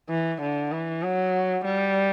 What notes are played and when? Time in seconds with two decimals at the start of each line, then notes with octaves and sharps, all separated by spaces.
0.10 E3
0.42 D3
0.72 E3
1.03 F#3
1.65 G3